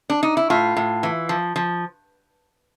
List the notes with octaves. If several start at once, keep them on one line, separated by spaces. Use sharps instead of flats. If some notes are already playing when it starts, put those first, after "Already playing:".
D4
D#4
E4
A2 F4
A2
E3
F3
F3